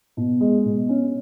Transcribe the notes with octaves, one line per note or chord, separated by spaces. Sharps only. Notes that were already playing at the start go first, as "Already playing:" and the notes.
B2
G#3
B2
C#4